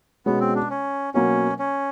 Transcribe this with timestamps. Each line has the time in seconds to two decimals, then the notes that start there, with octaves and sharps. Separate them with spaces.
0.26 B2 G#3 B3 C#4
0.40 C4
0.55 D4
0.70 C#4
1.14 B2 F#3 A#3 C#4
1.59 C#4